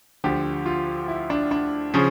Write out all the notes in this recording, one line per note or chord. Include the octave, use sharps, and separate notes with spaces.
D2 D3 F3 G4
F4
E4
D4
D4
C#3 F3 C#4